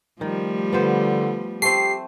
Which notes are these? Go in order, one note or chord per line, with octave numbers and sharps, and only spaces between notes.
D#3 F3 G3 A3
D3 B3 F4 C5
A3 C4 G4 C7